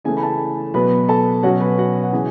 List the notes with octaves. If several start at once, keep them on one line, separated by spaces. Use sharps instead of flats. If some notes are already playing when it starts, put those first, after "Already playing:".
C#3 E3 A3 G#4 G#5
B5
A4 A5
B2 F#3 B3 B4 B5
A4 A5
B2 F#3 C#4 F#4 F#5
B4
F#4 F#5
F#5
C#3 E3 G#4 G#5